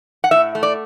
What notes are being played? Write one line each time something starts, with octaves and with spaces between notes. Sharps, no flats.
F#5
A2 E5
A3
D5